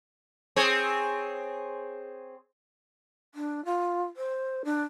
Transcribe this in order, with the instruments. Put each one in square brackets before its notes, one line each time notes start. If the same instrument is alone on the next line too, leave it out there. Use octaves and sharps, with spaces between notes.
[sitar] C4 G#4 C#5
[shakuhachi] D4
F4
C5
D4